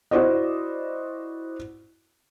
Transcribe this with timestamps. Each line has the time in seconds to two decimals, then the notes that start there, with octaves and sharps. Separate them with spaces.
0.11 E4 F#4 C5 D5 D#5